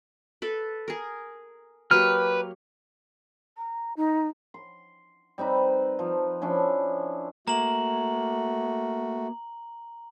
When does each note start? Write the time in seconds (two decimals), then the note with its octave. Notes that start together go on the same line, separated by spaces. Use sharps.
0.42 A4 B4
0.88 G#4 A#4
1.91 F#3 A#3 G4 B4 F6
3.57 A#5
3.96 D#4
4.54 C6
5.38 G3 C4 D#4 B4
5.99 F3
6.42 F3 C#4 D4 E4
7.48 A3 A#3 F#4 A#5 F#7